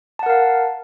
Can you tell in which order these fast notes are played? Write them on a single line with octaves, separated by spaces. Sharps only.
A5 F#5 A#4 F5